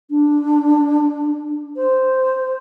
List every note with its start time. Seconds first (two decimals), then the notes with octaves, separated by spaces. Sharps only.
0.10 D4
1.76 C5